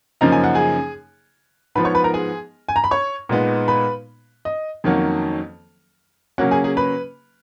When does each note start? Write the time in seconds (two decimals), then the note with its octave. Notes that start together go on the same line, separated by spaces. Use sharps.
0.21 F#2 C#3 F3 A#3 D#4 A#5
0.32 G#5
0.44 F#5
0.55 G#4 G#5
1.75 G#2 F3 B3 B4 B5
1.85 C#5 C#6
1.95 B4 B5
2.04 A#4 A#5
2.14 G#4 G#5
2.69 G#5
2.76 A#5
2.84 B5
2.91 C#5 C#6
3.29 A#2 G#3 B3 D#4
3.68 B4 B5
4.45 D#5
4.84 F2 D#3 F#3 A#3 C#4
6.38 C#3 F#3 A#3 C#4 F#4 F#5
6.51 G#4 G#5
6.64 G#4 G#5
6.77 B4 B5